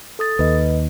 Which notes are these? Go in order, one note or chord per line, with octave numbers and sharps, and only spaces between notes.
A4 D#6 A6
D#2 B4 D#5